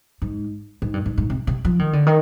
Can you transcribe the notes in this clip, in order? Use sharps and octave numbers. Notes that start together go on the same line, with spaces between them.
G#2
G#2
G2
G#2
G#2
C3
C3
F3
D#3
D3
D#3